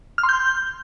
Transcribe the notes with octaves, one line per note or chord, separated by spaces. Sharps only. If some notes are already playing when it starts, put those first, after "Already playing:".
F6
C6
G6